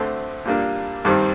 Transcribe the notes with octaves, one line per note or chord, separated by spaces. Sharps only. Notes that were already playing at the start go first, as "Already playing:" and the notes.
Already playing: D2 D3 A3 C4
A#2 G3 A#3 D4
G2 D#3 G3 C4